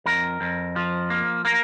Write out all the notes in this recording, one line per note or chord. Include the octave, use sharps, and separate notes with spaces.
F2 A#4
F2
F3
A#3
A#3 A#4